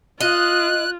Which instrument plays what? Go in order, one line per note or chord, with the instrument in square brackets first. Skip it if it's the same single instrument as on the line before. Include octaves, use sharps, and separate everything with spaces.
[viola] F4 [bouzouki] D#5 [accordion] F#6